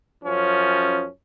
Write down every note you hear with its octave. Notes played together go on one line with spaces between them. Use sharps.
F#2 F3 C#4